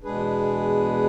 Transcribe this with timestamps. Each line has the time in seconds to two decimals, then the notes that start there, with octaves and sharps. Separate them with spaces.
0.03 E2 B2 G#3 D4 G#4 B4